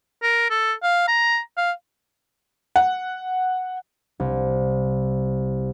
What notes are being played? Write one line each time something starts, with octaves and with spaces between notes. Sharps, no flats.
A#4
A4
F5
A#5
F5
F#5
C2